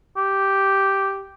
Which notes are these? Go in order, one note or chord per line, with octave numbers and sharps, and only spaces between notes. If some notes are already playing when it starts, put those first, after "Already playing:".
G4